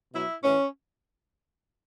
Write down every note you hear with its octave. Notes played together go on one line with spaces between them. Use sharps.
B2 F#3 E4
A2 E3 C#4